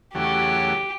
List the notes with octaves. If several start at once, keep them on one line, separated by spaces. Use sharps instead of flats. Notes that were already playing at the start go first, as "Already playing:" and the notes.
E2 C#3 F#3 A3 G4